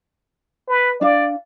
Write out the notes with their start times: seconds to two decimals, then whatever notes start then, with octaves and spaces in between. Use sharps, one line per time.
0.68 B4
1.01 D4 D5 F5